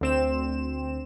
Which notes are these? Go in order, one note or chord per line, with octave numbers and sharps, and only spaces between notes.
D2 C4 E7